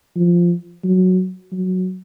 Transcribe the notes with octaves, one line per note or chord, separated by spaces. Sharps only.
F3
F#3
F#3